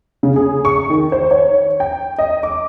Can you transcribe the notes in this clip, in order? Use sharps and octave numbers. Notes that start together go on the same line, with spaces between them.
C#3
G#4
C#6
D#3
C5
C#5
G5
D#5
D6